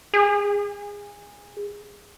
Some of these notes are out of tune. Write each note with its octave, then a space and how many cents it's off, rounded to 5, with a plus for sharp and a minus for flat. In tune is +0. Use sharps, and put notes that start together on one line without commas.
G#4 -20